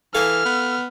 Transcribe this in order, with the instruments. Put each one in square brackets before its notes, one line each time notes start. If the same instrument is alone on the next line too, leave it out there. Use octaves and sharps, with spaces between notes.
[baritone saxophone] E3 [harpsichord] A4 F5 G#5 [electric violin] F6
[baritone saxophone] B3